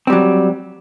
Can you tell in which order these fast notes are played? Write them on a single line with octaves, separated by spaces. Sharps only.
C4 G3 F#3